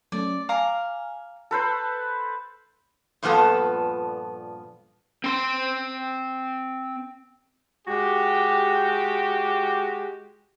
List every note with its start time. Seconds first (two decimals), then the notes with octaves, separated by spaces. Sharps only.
0.12 F#3 A3 C#4 D5
0.49 F5 G#5 A#5 D6 F6
1.51 A4 B4 C5
3.23 G2 A#2 F3 B3 A4
5.24 C4 C6
7.87 G#3 F#4 G4